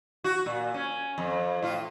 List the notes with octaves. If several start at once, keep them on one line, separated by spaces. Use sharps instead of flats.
F#4
A#2
C#4
F2
A2 F4